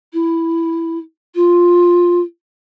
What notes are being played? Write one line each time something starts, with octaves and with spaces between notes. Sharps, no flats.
E4
F4